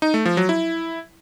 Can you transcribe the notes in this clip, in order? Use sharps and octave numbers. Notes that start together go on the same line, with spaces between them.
D#4
A3
F3
F#3
E4